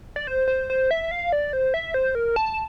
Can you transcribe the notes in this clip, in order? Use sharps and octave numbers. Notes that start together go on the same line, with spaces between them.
D5
C5
C5
C5
E5
F5
D5
C5
E5
C5
A#4
A5